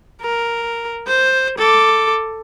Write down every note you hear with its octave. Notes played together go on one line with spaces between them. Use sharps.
A#4
C5
A4 D6